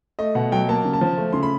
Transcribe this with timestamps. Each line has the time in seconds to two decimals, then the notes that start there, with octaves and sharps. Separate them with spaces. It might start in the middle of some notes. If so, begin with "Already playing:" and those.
0.19 A3 D#5
0.35 B2 F#5
0.52 F#3 G5
0.68 A#3 A5
0.85 C#3
0.93 A5
1.01 F3
1.17 A3
1.33 C#3 C6
1.43 B5